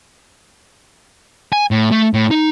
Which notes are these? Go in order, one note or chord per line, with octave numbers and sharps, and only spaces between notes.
G#5
A2
A3
A2
D#4